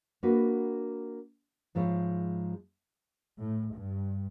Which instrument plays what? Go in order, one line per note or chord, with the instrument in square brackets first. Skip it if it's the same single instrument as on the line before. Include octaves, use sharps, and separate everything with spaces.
[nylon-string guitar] A#3 D4 F#4 B4
G#2 F3 G#3 E4 C#5
[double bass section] A2
G2